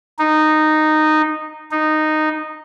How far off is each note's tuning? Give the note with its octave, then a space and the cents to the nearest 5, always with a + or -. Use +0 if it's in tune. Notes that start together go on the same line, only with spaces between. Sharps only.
D#4 -10
D#4 -10